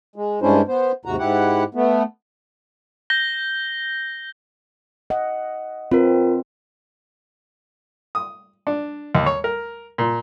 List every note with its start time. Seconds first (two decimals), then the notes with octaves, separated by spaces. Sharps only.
0.16 G#3
0.42 G2 G#3 C#4 D4 E4 C5
0.68 B3 C5
1.05 D#2 G#2 C3 F#4 A#5
1.19 G#2 E4 G4 F#5
1.75 A3 B3
3.10 G6 A#6 G7
5.10 D#5 F#5
5.92 C4 F4 A#4 B4
8.15 D#6
8.67 D4
9.15 D#2
9.26 C#5
9.44 A#4
9.98 A#2